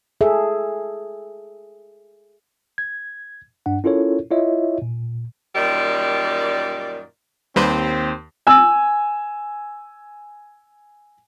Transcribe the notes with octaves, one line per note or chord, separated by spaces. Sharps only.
G#4 A4 E5
G#6
G2 D4 F#5
C#4 E4 F4 A4 A#4 C#5
E4 F4 C#5 D#5 E5
A#2
F#2 A#2 D#3 G3 D5
D#2 G3 C4 B4 C5
G#5 E6